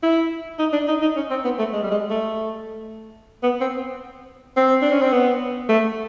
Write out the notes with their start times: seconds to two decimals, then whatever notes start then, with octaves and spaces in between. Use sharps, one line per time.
0.03 E4
0.59 D#4
0.73 D4
0.88 D#4
1.02 D#4
1.16 C#4
1.31 C4
1.44 B3
1.59 A3
1.73 G#3
1.82 G3
1.91 G#3
2.10 A3
3.43 B3
3.61 C4
4.57 C4
4.82 D4
4.91 C#4
5.02 C4
5.13 B3
5.69 A3